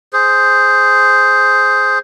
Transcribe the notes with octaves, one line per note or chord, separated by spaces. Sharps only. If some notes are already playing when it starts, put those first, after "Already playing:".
G#4 C5